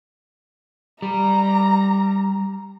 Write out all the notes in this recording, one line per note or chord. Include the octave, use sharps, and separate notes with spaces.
G3 A#5